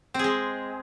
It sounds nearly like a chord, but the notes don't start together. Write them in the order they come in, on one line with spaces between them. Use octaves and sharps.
C4 G#4 G#3